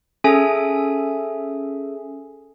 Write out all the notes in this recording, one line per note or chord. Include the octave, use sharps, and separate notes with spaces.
C#4 G#4 A4 E5 G#5